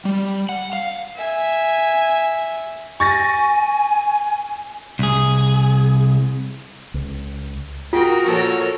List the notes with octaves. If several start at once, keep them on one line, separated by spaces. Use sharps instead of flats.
G3
F#5
F5
E5 G#5
G#5 C#6 A6 A#6
C2 G#4
C#2
F4 F#4 G#4 A#4 G5
A#2 F3 A4 C#5